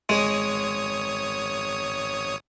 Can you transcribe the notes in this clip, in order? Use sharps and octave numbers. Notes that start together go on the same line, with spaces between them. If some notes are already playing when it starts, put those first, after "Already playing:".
G#1 G#3 C#5 D#6